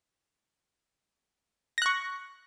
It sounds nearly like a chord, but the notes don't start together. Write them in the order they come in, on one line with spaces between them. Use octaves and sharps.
A#6 F#6 C#6